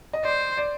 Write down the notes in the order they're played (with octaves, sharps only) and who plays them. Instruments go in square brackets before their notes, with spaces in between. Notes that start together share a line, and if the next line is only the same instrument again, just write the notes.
[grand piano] D#5
[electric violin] C5 [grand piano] D5
[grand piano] D5